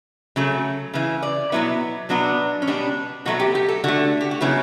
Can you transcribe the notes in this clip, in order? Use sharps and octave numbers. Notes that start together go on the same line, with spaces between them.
C#3 F#3 A3
C#3 E3
D5
B2 F#3 B3 E4
B2 F#3 B3 D4
C#4
B2 G3 B3 D4
B2 F#3 A3 F#4
G4
G4
A4
D3 A3 F#4
G4
F#4
C#3 F#3 B3 E4